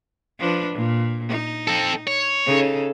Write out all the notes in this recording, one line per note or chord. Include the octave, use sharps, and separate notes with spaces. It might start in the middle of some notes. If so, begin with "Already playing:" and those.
F3 D4 B4
A#2
D#4
C4 A4
C#5
C#3 D#4 A4